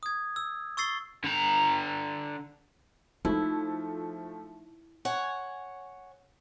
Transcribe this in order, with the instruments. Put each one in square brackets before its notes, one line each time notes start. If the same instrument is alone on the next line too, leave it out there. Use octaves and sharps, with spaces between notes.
[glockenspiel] D#6 G#6
E6
C#6 E6 A6 C7 G7
[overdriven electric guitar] D3 A#5
[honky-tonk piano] F3 A3 [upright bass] D#4 [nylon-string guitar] E4
[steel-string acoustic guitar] C#5 F#5 G#5